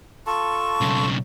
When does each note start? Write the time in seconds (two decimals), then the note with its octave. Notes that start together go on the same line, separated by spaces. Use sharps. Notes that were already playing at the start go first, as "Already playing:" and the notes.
0.27 F4 A4 A5 C#6
0.81 B1 C#3